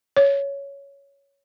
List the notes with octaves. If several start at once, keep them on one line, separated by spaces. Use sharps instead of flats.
C#5